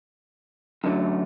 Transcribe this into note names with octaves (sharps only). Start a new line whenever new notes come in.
F#2 D3 F#3 A3